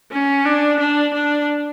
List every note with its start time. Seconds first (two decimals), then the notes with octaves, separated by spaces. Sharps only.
0.11 C#4
0.45 D4
0.79 D4
1.14 D4